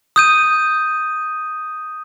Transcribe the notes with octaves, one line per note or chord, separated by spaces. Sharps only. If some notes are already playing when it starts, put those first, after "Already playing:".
D#6 G6 D#7